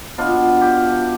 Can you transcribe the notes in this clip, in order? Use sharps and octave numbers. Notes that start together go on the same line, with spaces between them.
B2 B3 D4 F4
G4